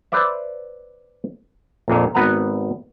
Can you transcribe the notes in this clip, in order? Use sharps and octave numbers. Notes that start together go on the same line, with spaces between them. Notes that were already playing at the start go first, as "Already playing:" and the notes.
B4 C5 D5 E5
A#1 F2 A#2
G#1 B3 B4 F#5 A#5